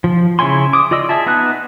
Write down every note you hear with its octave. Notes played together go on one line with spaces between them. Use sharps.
F3
C#3 E4 C#5 G#5 C6
D6 D#6
F4 D5 D#5 E6
G#4 E5 A5
B3 D#4 D#6 F#6